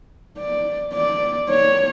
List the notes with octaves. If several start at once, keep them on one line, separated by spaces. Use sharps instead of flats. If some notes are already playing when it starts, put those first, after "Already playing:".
D5
D5
C#5